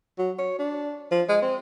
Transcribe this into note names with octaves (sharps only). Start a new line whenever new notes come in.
F#3
C#5
D4
F3
G#3
C4